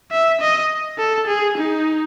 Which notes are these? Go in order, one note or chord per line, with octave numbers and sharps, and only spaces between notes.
E5
D#5
A4
G#4
D#4